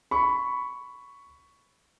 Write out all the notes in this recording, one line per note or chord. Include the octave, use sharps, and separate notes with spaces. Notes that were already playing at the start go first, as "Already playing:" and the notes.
B5 C#6